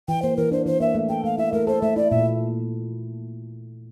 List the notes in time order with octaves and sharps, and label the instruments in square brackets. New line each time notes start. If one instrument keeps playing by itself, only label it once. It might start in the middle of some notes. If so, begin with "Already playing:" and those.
[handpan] E3 [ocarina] G5
[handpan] A#3 [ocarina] C5
[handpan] E3 [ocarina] A#4
[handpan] D4 [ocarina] C5
[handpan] E3 [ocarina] C5
[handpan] A#3 [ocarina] E5
[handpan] A3
[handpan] A4 [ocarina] G5
[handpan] A3 [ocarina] F5
[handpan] E4 [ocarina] E5
[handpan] A3 [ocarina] A#4
[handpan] A4 [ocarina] C5
[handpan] A3 [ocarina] E5
[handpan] E4 [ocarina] D5
[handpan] A#2 [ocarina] E5